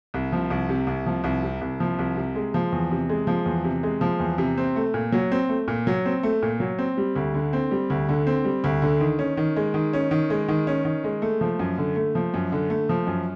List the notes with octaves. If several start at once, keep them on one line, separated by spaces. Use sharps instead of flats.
C2
F3
C2
C3
C2
F3
C2
C3
C2
F3
C2
C3
G#3
F3
E2
C3
G#3
F3
E2
C3
G#3
F3
E2
C3
C4
A3
A#2
F#3
C4
A3
A#2
F#3
C4
A3
A#2
F#3
C4
G3
D2
D3
C4
G3
D2
D3
C4
G3
D2
D3
D#3
C#4
D#3
G#3
D#3
C#4
D#3
G#3
D#3
C#4
D#3
G#3
A3
F3
F#2
D3
A3
F3
F#2
D3
A3
F3
F#2